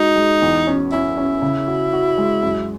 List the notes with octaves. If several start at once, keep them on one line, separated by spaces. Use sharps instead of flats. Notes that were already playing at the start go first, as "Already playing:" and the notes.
Already playing: G#3 D#4 F#4
G#3
E2
C#4
C#4 E4
C#4
C#3
F#4
F#4
G#3
F#2